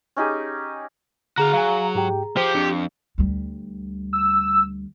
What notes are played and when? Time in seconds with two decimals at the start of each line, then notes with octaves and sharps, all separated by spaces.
0.17 C#4 D#4 G4 G#4
1.38 D3 F#4 G#4 F5 A#5
1.53 F#3 F5 G#5
1.95 G#2 G4 G5
2.37 F3 G4 C5
2.55 F2 D4
3.18 D2 G3
4.13 E6